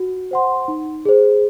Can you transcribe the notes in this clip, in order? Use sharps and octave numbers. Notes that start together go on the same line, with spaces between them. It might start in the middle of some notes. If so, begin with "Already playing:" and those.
Already playing: F#4
C5 F#5 C6
D#4
G#4 C5